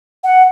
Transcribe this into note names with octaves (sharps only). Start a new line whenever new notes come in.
F#5